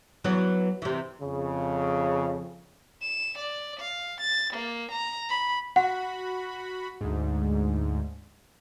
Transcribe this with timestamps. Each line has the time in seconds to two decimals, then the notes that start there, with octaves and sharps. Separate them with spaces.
0.24 E3 F#3 B3
0.82 C3 E3
1.20 F2 C#3
3.02 E7
3.38 D5
3.80 F5
4.21 A6
4.53 A#3
4.91 A#5
5.29 B5
5.76 F#4 F#5 B5
7.01 D2 G#2